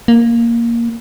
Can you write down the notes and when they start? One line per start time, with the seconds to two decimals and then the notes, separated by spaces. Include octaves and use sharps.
0.08 A#3